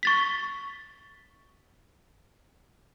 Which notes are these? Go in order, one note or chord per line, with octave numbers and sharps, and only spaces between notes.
C#6 A6 B6